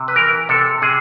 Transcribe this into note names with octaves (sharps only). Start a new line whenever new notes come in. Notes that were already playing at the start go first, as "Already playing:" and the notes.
Already playing: C3
B4
E3 A#4
C3 A4
C3 G#4